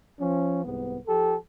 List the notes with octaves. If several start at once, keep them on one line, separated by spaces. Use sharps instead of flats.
F3 C#4
C2 G#2 B3
F3 G4 A4